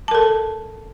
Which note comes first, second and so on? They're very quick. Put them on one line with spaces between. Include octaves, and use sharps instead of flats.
A5 A#4 A4